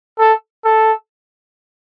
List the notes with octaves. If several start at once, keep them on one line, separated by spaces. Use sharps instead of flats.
A4
A4